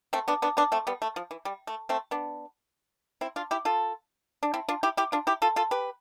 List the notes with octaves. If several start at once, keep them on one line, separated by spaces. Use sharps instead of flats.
A3 C4
B3 D4
B3 D4
B3 D4
A3 C4
G3 B3
A3
F3
E3
G3
A3
A3 C4
B3 D4
C4 E4
D4 F4
E4 G4
F4 A4
D4
C4 E4
D4 F4
E4 G4
E4 G4
D4 F4
E4 G4
F4 A4
F4 A4
G4 B4